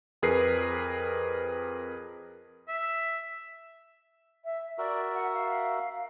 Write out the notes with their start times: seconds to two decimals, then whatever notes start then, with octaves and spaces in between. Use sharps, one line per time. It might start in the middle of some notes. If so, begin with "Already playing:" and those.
0.23 F2 G#4 A#4 B4 C7
2.68 E5
4.44 E5
4.78 F#4 A#4 D5 E5
5.13 F#5
5.34 F5